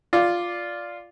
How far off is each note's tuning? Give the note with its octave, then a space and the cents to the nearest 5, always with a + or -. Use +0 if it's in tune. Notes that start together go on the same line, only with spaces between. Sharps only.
F4 +0 D5 +0